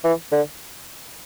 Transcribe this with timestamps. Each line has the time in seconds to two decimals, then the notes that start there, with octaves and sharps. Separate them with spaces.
0.04 E3
0.32 D3